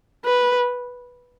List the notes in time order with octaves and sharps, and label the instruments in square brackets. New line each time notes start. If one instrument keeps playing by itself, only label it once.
[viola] B4